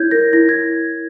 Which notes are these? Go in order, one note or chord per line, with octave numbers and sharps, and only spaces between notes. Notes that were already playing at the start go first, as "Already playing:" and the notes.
Already playing: E4 C#5 G6 G#6
A#4 A#6
E4 A#6
G#6